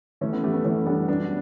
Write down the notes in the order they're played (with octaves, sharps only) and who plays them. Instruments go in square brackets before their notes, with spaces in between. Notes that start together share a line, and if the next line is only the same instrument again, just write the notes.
[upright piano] E3 [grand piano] A3 C#4
[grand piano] B3
[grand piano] A3 [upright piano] G4
[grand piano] B3
[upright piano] E3 [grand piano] A3 C#4
[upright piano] G3 [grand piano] B3 D4
[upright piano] F#3 [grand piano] B3 D4